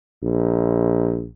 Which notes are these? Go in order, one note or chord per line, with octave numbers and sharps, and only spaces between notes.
A#1